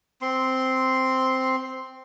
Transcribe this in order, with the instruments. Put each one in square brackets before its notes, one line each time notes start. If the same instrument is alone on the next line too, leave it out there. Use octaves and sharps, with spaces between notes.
[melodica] C4 C6